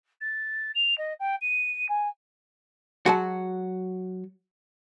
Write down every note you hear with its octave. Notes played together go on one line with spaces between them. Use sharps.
A6
F7
D#5
G5
D#7
G#5
F#3 G#3 F#4 A5